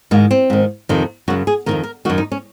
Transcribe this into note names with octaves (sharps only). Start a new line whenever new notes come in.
G#2 D#3 A#3
C4
G#2 D#3
F2 C3 D#3
F#2 C#3 F#4
G#4
F2 C3 D#3 A#4
A#4
F#2 D#3 F#4
D#4
C#4